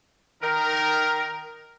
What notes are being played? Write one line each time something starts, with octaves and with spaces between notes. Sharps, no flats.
D#3 A#4